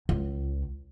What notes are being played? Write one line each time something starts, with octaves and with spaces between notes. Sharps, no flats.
C#2